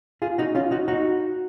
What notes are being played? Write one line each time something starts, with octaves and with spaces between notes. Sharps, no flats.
F4 G#4
D#4 F#4
C#4 F4
D#4 F#4
D#4 F#4